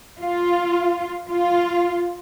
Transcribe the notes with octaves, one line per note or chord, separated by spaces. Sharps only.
F4
F4